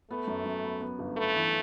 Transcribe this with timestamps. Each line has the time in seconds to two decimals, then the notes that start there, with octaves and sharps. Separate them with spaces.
0.10 A3 B3
0.27 F#2
0.45 F#2
0.64 B3
0.81 B3
0.99 G1
1.17 A3 B3
1.35 E3